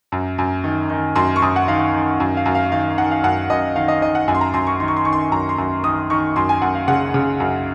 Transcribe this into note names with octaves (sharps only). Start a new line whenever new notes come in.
F#2
F#2
D#3
D#3
F#2 C6
C#6
F#2 D#6
F#5
D#3 F5
D#3
F#2
F5
F#2
F5
D#3 F5
D#3 F#5
F5
F#2 F#5
F#2 D#5
D#3 F5
D#5
D#3 D#5
F#5
F#2 G#5
C6
A#5
F#2 C6
C#6
D#3 C6
C#6
C6
D#3 C#6
C6
F#2 A#5
C6
F#2
D#3 D#6
D#3 C#6
F#2 C6
G#5
F#2 F#5
F5
C#3 F#5
C#3
F#2